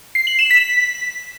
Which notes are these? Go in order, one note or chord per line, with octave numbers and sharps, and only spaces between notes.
C7
F#7
E7
B6